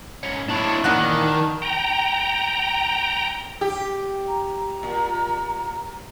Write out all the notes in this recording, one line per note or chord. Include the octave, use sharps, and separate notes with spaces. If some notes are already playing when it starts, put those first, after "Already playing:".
G#2 C#4
D#2 D4 E4 C#5
A#2 D#3 E3 D4 F#4 F#6
G5 A#5
G4
A#5
A#2